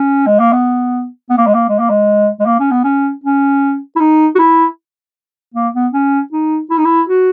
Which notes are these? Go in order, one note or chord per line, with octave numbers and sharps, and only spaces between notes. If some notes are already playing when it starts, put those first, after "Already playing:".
Already playing: C#4
G#3
A#3
B3
B3
A#3
G#3
A#3
G#3
A#3
G#3
G#3
A#3
C#4
B3
C#4
C#4
E4
D#4
F#4
E4
A#3
B3
C#4
D#4
E4
D#4
E4
F#4